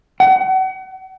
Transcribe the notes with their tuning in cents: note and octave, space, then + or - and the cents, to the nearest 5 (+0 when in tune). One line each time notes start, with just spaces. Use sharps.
F#5 +35